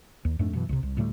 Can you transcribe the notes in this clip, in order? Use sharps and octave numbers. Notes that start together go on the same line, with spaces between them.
D#2
F2 G#2 A3 D4
F#2 B2 E3
C2 C3
C2
D2 A2 G3 A3